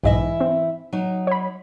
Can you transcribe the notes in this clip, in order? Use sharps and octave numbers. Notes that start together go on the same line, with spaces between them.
B1 G#2 E3 E4 D#5 E5
C4
F#3 D#4
C#5 B5